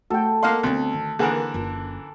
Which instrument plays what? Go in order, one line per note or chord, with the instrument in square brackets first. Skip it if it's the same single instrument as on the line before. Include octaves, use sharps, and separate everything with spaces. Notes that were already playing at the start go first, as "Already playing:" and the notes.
[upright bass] A3 [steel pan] F#4 G5 [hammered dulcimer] A4
[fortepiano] A#3 F#5 C6 [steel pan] D#5 F5
[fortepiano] D2 [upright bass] B3 C4
[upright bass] D#3
[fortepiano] D3 E3 A#4 [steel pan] A#3 G#4 F#5
[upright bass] F#1 F4